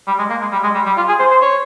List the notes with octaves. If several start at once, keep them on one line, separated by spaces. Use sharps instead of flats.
G3
G#3
A#3
G#3
G3
G#3
G3
G3
F4
G#4
C5
C5
C#5